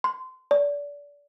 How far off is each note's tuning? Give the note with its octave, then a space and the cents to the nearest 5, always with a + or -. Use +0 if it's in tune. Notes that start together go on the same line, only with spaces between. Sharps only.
C6 -25
D5 -30